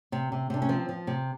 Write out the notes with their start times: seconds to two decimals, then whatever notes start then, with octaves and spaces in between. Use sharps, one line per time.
0.12 C3
0.32 C3
0.50 C3 D4
0.62 C#4
0.69 F3 C4
0.89 F3
1.07 C3